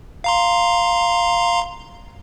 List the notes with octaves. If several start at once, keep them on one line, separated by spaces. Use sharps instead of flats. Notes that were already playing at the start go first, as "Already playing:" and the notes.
F5 A#5 C6